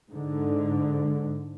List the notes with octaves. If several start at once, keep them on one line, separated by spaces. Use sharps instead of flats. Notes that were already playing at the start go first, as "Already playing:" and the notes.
G#2 D3